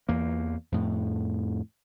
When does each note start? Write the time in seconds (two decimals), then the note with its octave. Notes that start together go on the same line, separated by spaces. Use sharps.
0.09 E2 A#3
0.72 F2 A2